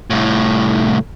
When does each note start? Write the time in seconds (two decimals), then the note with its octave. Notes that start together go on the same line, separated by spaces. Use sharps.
0.10 C2 A2